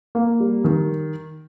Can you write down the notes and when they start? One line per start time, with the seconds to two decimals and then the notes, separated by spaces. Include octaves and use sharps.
0.15 A#3
0.40 G3
0.65 D#3